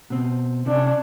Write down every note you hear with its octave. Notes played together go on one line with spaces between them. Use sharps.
B2 C4
C3 C#4 D4